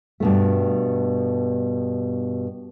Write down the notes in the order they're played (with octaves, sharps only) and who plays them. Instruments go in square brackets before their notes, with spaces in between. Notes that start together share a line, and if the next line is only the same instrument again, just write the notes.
[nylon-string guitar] G2 B2 A3